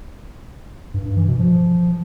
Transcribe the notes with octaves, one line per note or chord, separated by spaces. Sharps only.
G2
G2
E3
B2
F3